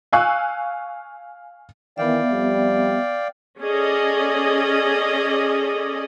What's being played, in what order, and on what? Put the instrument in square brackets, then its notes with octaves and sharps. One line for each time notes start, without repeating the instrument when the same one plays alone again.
[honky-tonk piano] F5 G#5 C#6 E6 F#6
[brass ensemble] D#3 E3 [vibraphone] B3 E5 [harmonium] D5 F5 G5
[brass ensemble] F2 G3
[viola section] C#4 G#4 A4 D5 D#5